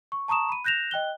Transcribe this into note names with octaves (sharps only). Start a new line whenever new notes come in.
C#6
A5 A#5 C#6 D#6 E7
B5 D#7
F#6 G6 A#6 E7 F7
D#5 G5 F#6 G7